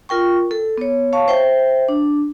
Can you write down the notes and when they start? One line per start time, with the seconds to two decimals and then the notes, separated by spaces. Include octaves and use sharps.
0.09 F4 A#4 G5 C#6
0.51 A4
0.78 B3 C#5
1.13 C#5 F5 A5 C#6
1.28 C5 E5 G5
1.89 D4